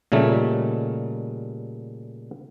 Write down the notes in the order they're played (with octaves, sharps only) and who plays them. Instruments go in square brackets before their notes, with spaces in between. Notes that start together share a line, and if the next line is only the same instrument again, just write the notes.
[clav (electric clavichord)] A#2 C#3 G3 A3 D#4